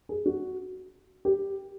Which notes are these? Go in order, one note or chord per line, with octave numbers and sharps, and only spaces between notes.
G#4
F#4
G4